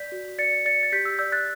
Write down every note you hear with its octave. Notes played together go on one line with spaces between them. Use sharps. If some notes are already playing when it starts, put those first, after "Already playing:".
Already playing: D5 G6 B6
F#4
D5 A6 C#7
D5 A6 C#7
A6
G4 G6 B6
E6 G6
D5 E6 G6
F#6 A6